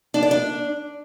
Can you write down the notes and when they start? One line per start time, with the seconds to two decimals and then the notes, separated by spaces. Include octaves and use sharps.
0.14 D4
0.23 D5
0.31 D4